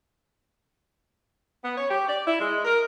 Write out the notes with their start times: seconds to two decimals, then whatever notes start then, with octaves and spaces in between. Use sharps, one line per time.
1.64 B3
1.77 C#5
1.90 G4
2.08 D5
2.26 E4
2.40 G#3
2.65 A#4